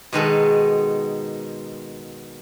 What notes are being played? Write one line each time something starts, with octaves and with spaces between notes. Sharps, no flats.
B2 D#3 G#3 A4